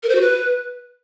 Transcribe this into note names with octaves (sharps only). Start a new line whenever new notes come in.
A#4
C5
F#4
B4